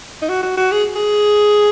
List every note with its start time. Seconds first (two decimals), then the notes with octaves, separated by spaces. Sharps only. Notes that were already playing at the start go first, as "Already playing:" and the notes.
0.22 D#4
0.29 F#4
0.43 F#4
0.57 F#4
0.71 G#4
0.95 G#4